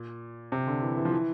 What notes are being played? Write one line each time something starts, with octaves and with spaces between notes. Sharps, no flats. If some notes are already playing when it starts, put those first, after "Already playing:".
Already playing: A#2
C3
D3
E3
E3
F3
E3